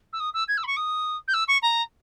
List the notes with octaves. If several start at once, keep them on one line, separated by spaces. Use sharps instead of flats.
E6
D#6
E6
G#6
E6
B5
C#6
D#6
G6
E6
C#6
A#5